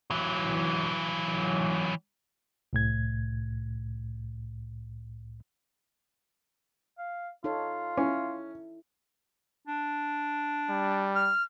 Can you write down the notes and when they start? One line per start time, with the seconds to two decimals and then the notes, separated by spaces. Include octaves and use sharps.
0.10 E3 F#3
2.73 C2 A2 G#6
6.98 F5
7.44 D#4 F4 A4 C#5
7.98 C#4 E4
9.67 D4
10.69 G3
11.15 F6